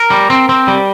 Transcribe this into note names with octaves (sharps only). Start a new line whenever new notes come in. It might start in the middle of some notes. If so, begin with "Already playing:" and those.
Already playing: A#4
G3
C4
C4
G3